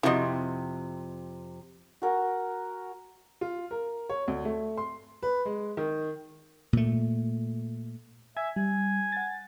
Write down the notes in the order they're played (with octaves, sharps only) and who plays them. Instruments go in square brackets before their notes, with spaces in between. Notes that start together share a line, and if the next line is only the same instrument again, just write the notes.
[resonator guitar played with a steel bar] F2 C3 [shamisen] E4 F#4 D#5
[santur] F#4 A#4 G#5
[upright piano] F4
A#4
C#5
D2
A3
C6
B4
G#3
D#3
[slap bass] A#2 A3
[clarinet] E5 [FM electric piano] G#5 E6 G#6
[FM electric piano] G3 [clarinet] G#5
[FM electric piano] F#5 A6